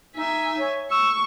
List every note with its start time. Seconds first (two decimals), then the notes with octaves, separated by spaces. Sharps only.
0.16 D#4 E5 G#5
0.58 C#5
0.91 C#6 E6